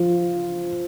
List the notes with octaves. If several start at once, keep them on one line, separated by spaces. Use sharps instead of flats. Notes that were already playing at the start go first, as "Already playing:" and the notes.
Already playing: F3